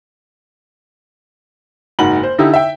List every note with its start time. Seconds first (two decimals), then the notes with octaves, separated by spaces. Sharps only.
1.99 F#1 G#2 F#4 B5 F#7
2.23 C5
2.38 D3 D#4 E4 G4
2.54 E5 G5